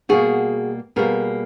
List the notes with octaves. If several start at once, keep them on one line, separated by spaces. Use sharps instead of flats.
B2 G3 A#3 F#4 G#4
B2 G3 A#3 G#4 A#4